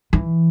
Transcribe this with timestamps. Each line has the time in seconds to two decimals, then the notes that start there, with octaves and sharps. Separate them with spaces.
0.13 E3